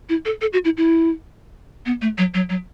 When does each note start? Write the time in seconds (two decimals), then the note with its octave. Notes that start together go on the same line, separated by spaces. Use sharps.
0.09 E4
0.25 A4
0.41 A4
0.53 F#4
0.65 E4
0.77 E4
1.86 B3
2.02 A3
2.18 F#3
2.34 F#3
2.49 F#3